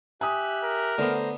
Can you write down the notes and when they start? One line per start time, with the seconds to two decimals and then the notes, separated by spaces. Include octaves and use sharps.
0.21 G4 E5 G#5 D#6 F#6
0.64 A#4
0.98 D3 A3 B3 C5 A#5